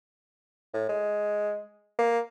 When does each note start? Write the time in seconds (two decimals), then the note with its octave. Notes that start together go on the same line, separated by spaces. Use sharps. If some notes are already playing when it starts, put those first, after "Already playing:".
0.74 A2
0.89 G#3
1.99 A#3